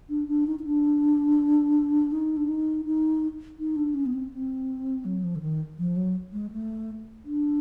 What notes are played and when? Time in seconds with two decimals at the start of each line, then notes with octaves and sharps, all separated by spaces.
0.09 D4
0.28 D4
0.47 D#4
0.59 D#4
0.64 D4
2.12 D#4
2.37 D4
2.48 D#4
2.85 D#4
3.59 D#4
3.76 D4
3.94 C#4
4.06 B3
4.13 C4
4.32 C4
5.05 F#3
5.24 F3
5.36 D3
5.42 D#3
5.78 F3
5.96 F#3
6.33 G#3
6.52 A3
7.25 D4